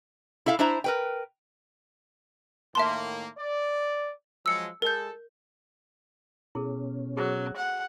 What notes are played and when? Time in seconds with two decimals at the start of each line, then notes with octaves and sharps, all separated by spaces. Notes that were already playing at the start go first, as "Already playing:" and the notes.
0.46 E4 A4 E5 F5
0.59 D4 E4 C5 E5 A#5
0.84 A#4 B4 G5
2.75 A2 D#3 A#3 E5 A5 C6
3.38 D5
4.46 F3 F#3 G#3 E6 C#7
4.82 G#3 A4 A#4 G6
6.55 B2 C#4 E4 G#4 A4
7.17 F#3 G#4 A4 C5
7.57 F#5